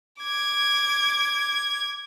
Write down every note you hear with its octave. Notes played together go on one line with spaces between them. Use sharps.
D6 G#6